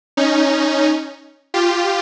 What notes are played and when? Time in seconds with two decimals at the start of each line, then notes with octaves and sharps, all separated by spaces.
0.17 C#4 D#4
1.54 F4 G4